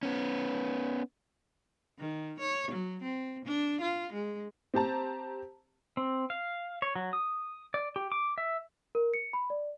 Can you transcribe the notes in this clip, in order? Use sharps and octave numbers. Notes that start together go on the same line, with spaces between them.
B3 C#4
D#3
C#5
F#3
C4
D4
F4
G#3
C4 G4 C5 A5 A#5
C4
F5
C#5
F#3
D#6
D5
G4
D6
E5
A#4
C#7
B5
D5